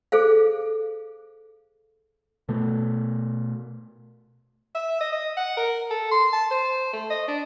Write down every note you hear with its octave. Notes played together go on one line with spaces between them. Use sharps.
G#4 A4 C5 F5
B2 A3
E5
D#5
D#5
F#5
A#4
A4
C6
A5
C5
A3
D#5
D4